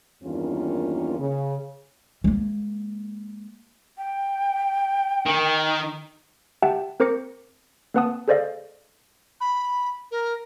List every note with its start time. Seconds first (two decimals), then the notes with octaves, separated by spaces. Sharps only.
0.22 E2 G2 D#3 A#3 C#4 F4
1.19 C#3
2.24 G#3 A#3
3.98 G5
5.26 D#3
6.62 G4 E5 F#5 G5 A5
7.00 C4 A#4 C5 D6 A#6 C#7
7.94 A#3 C4 B4 F#5 A5 D#6
8.28 G#4 A4 C5 D5 D#5 F5
9.40 B5
10.11 A#4